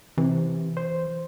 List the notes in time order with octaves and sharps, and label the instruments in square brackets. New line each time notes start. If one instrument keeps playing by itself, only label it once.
[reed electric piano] C3 [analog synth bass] E3
[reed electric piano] C5